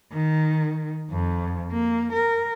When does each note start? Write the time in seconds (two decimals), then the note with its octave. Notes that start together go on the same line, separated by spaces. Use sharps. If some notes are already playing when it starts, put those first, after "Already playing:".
0.12 D#3
1.11 F2
1.72 A#3
2.13 A#4